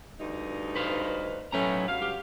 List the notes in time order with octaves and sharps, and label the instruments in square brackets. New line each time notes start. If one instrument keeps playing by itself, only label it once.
[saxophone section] D2 G2 D#4
[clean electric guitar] B4 C5 F5
[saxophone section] A2 A3 C#4 [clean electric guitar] F#3 B4 A#5
[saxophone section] G2 F#3 F5
[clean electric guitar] G4